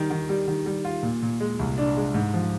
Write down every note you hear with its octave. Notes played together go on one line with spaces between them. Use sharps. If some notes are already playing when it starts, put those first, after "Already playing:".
Already playing: D#3 G3
D#3
G3
D#3
G3
F4
A#2
A#2
G#3
C2
D4
G#3
G#2
F3